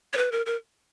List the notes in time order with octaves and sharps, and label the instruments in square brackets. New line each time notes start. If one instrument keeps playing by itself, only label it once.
[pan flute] C#5
B4
A#4
A#4